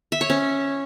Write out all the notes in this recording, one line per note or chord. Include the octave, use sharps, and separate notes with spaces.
E5
C#5
C#4